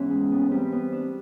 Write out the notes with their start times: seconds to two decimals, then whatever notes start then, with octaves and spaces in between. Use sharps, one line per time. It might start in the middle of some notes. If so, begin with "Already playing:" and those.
Already playing: G#2 E3 B3 C#4
0.10 G#3
0.31 B3
0.51 G3 C4
0.72 B3
0.92 D4